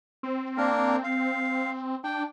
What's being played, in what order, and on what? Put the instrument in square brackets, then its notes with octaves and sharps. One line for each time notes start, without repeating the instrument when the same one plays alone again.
[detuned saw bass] C4
[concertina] A#3 D4 A#4
F5
[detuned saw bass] D4 [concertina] G5